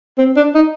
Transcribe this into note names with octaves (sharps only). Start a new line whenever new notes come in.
C4
D4
D#4